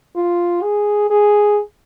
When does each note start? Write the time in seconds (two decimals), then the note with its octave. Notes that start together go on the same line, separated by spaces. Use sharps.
0.16 F4
0.62 G#4
1.10 G#4